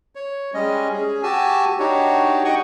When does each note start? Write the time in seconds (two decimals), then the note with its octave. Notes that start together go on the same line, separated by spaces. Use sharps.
0.15 C#5
0.54 G3 G#3 C#4 D#5
0.93 C#4 G#4
1.23 F#4 G4 G#5 A5 E6
1.79 D4 D#4 F#4 G4 C#5
2.45 D#5 F#5 G5 C#6 D#6